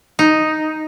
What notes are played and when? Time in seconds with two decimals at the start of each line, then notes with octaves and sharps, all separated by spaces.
0.19 D#4